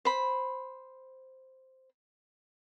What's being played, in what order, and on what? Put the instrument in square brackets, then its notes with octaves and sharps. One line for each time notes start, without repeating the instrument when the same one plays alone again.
[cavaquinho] C5 B5